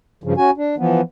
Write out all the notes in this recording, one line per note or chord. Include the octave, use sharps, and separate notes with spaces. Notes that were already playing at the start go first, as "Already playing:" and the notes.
G2 C#3 F3
C#4 F#4 G#5
D4
E3 F3 B3